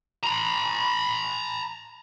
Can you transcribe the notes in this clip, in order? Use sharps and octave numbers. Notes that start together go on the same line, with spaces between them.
A#5 B5